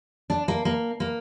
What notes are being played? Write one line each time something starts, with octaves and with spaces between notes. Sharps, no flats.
D4
A#3
A#3
A#3